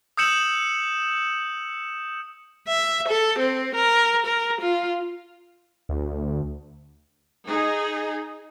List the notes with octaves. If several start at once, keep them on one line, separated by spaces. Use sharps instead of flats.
D#6 E6 G6 C#7 E7 F#7
E5
A4
C4
A#4
A#4
F4
D2
D#4 G#4